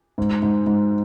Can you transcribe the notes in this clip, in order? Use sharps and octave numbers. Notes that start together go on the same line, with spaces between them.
G#2
G#2
G#2